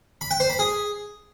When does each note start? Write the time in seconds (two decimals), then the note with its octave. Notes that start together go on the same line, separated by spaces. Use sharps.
0.21 B5
0.31 G5
0.40 C5
0.50 B5
0.59 G#4